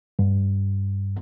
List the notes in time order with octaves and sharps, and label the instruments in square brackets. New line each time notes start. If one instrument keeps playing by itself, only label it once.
[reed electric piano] G2